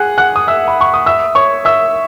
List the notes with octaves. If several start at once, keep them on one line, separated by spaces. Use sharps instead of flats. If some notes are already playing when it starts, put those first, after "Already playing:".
Already playing: G#4 F#5 F#6
F#5 F#6
D#6
E5 E6
B5
C#6
D#6
E5 E6
C#5 C#6
E5 E6